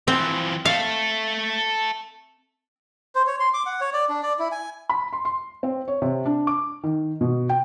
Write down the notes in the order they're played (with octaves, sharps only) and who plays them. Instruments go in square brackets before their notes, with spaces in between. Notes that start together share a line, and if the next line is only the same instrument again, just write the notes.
[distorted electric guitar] E3 F3 [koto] C4
[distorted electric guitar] A4 E5 [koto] F5
[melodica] C5
C#5
C6
D6
F#5
C#5
D5
D4
D5
E4
G#5
[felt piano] B5
C6
C6
C4
C#5
C3
D4
D6
D#3
B2
G5